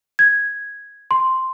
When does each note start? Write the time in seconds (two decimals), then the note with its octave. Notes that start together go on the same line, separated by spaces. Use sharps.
0.19 G#6
1.11 C6